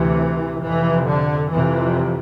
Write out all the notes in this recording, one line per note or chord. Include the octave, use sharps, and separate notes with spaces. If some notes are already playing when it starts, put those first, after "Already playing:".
Already playing: D2 C3 E3
F2 C3 E3
D3
F2 C3 E3